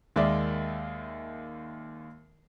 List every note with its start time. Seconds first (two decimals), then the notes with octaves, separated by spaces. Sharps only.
0.16 D#2 G#3 A#3 D5 E5